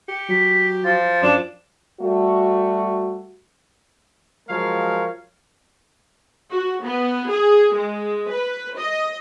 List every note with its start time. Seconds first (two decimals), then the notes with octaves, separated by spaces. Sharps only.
0.09 G4 C#7
0.29 F#3 B6
0.84 F3 A6
1.22 F#2 F3 D4 E7
2.01 G3 A3 F#4
4.49 F3 F#3 G#3 A#4 C#5 F5
6.51 F#4
6.82 B3
7.30 G#4
7.74 G#3
8.31 B4
8.78 D#5